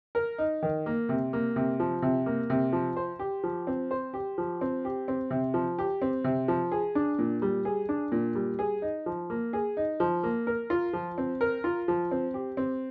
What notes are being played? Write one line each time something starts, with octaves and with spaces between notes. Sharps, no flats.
A#4
D#4
D#3
A#3
C3
A#3
C3
F3
C3
A#3
C3
F3
C5
G4
F3
C4
C5
G4
F3
C4
G4
C4
C3
F3
G4
C4
C3
F3
G#4
D4
A#2
G3
G#4
D4
A#2
G3
G#4
D#4
F3
A#3
G#4
D#4
F3
A#3
A#4
F4
F3
C4
A#4
F4
F3
C4
G4
C4